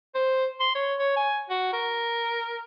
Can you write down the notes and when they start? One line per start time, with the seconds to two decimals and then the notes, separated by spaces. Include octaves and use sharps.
0.14 C5
0.60 C6
0.75 C#5
0.99 C#5
1.16 G#5
1.49 F#4
1.73 A#4